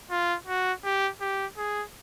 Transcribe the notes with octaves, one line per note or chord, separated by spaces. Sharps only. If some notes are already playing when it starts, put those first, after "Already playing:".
F4
F#4
G4
G4
G#4